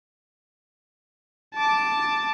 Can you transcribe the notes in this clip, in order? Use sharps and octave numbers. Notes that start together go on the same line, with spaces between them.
A5 D6